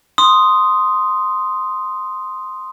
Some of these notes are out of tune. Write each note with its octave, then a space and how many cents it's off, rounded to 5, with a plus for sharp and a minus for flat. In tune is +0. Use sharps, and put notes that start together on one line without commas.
C6 +0 D#6 +0